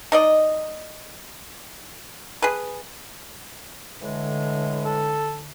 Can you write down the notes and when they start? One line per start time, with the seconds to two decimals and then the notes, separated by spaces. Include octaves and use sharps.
0.12 D#4 D5 D#5
2.42 G#4 B4
4.01 A2 D3 E3 G#3
4.86 A4